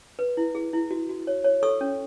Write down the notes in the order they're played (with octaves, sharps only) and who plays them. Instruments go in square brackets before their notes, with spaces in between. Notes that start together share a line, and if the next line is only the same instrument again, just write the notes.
[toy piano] B4
E4
G#4
E4
F#4
F#4
C#5
C#5
A4 C#6 E6
C#4